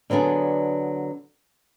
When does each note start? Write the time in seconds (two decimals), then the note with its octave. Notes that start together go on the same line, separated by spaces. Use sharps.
0.10 D3 F#3 B3 D4 G#4